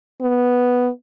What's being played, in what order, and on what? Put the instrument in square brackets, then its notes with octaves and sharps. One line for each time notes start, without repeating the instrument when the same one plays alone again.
[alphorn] B3